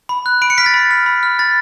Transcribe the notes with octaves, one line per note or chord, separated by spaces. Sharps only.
B5
F#6
B5 D7
C#7
F6 B6
A6
B5
F6
B5
F6
B5 A6